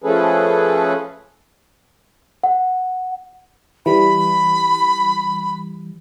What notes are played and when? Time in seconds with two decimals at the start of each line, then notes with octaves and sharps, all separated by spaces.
0.04 F3 A3 C#4 G#4 A4 B4
2.44 F#5
3.86 E3 G3 B5